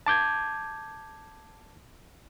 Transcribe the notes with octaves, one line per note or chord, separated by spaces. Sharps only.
A5 D6 G6 G#6